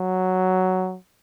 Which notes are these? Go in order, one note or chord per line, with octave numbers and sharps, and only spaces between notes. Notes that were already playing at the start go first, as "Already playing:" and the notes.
Already playing: F#3